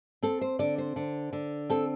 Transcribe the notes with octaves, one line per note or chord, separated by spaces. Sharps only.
C4 A4
C5
D3 D5
C5
D3
D3
C4 A4